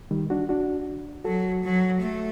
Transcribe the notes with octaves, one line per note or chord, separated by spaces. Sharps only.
D#3 G3
D4 F#4
D4 F#4
F#3 F#4 A4
F#3
A3